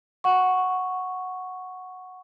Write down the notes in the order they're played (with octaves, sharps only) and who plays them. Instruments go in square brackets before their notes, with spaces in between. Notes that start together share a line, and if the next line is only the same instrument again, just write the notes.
[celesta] F#5 C#6